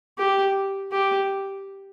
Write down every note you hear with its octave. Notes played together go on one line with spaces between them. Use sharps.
G4
G4